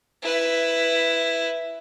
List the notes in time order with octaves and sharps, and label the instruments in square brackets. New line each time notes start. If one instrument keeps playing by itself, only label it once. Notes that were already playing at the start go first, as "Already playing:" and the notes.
[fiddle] E4 B4